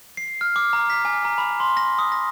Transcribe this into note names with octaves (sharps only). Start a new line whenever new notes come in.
C7
F6
D6
A#5
B6
G#5
A#5
B5
C6
A#6
D#6
A#6